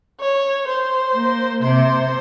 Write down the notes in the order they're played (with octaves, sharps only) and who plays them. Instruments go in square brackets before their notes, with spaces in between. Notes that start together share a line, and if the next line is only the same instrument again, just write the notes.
[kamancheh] C#5
C5
[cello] A#3
[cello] C3 [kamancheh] C5